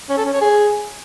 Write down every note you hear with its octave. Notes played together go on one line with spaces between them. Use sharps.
C#4
A4
C#4
C#5
G#4